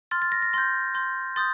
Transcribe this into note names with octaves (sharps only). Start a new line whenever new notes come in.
C6 F6 A6
A6
A#6
A#6
C6 G6 A#6
C6 G6
C6 D#6 G6 A6